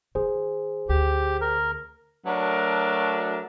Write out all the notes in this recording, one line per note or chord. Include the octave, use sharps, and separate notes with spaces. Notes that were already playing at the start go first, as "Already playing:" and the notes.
D#3 G#4 C5
D2 G4
A#4
F#3 A3 D4 F#4 A#4